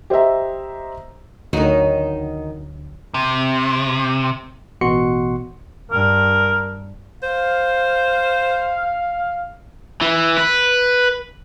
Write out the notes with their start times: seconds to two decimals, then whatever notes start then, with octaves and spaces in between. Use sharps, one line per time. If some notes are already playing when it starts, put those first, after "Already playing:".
0.10 G4 C5 D#5 E5 A#5
1.53 D2 D3 D#3 F#3 D#4 F#4
3.14 C3
4.81 A1 B2 F#4 C6 C#7
5.92 G2 A#4
7.23 C5 F5
10.01 E3
10.37 B4